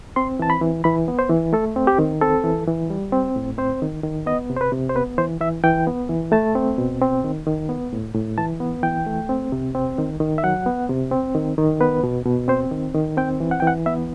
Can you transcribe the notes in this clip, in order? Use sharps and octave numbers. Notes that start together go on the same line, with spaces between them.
C4 C6
E3 A5
B5
E3
E3 B5
B3
C5
E3
A3 A4
C4
G4
D#3
C4 A4
E3
E3
G3
C4
A2
C4 C5
D#3
D#3
B3 D#5
C3
C5
B4
C3
C5
B3 B4
E3 C5
E3 E5
E3 G5
B3
E3
A3 A5
C4
B2
C4
D#3
D#3
B3
A2
A2
E3 A5
B3
E3 G5
A3
C4
C3
C4
D#3
D#3
E5
F#3 F#5
B3
C3
C4
D#3
D#3
B3 B4
B2
B2
C4 C5
D#3
D#3
C4 G5
E3
F#5
E3 G5
F#5
B3 E5